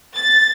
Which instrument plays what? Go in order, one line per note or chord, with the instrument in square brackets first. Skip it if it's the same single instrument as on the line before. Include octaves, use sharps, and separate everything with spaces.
[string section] A6